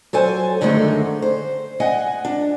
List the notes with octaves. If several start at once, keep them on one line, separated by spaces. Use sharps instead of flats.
F#3 A4 C5 G#5
F#2 D3 D#3 G#3 A3 D#4
C5
D#5 F#5 G#5
D4